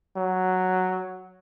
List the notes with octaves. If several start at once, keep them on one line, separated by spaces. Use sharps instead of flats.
F#3